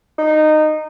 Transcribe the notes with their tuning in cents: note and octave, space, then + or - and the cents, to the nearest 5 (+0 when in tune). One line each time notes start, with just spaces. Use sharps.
D#4 -15